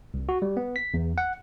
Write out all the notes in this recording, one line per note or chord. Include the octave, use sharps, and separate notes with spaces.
C2
F#4
G3
B3
B6
E2
F#5